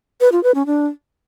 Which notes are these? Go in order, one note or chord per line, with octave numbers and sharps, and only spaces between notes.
B4
F4
B4
C#4
D4